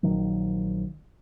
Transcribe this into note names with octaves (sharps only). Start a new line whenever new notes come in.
A#1 D#3 F#3